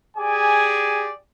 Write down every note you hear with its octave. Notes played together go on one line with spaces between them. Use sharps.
G4 G#4 D5 G#5